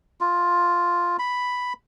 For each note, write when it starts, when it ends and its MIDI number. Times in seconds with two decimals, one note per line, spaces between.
0.21 1.17 65
1.19 1.73 83